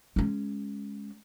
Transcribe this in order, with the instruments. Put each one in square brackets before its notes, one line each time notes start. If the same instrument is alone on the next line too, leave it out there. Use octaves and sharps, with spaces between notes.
[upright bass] G#3 C#4